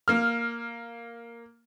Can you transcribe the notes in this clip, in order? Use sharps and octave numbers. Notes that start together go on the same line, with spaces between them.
A#3 F6